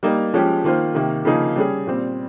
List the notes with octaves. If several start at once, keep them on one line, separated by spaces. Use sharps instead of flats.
G3 A#3 D#4
F3 G#3 C#4 G4
D#3 A#3 F4 C5
C3 D#3 A#3
C#3 F3 A#3 D#4 G#4
G3 C#4 G#4
A#2 G3 C4